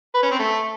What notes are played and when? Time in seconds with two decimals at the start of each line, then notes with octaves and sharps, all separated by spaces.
0.14 B4
0.23 C#4
0.31 C4
0.39 A3